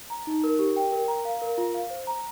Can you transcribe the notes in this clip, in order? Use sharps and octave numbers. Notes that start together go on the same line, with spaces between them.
A#5
D#4
A#4
G4
G5
A#4
A#5
F5
A#4
F4
F5
C5
A#5